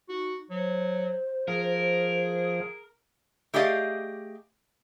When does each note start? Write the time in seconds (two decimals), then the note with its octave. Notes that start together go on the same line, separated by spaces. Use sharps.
0.09 D#4 F#4
0.50 F#3 C5
1.48 F3 G#4 A#4
3.54 A3 G4 G#4 D5 D#5 F5